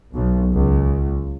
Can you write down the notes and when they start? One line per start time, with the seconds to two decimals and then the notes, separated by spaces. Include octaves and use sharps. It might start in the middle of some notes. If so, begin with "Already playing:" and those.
0.13 B1
0.50 C#2